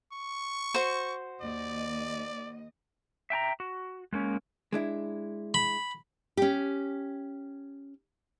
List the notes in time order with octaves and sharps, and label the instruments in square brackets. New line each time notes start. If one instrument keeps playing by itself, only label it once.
[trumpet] C#6
[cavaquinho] F#4 C5
[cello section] D#2 D#5 [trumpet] D5
[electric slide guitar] E5 G5 A5 A#5
F#4
G#3 A#3 C#4
[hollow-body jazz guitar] G#3 D4 E4
[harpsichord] B5
[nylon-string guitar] C#4 G4